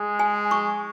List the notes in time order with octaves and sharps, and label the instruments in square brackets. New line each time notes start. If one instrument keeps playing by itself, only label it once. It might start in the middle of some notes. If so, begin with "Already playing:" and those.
Already playing: [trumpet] G#3
[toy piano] G#5
C#6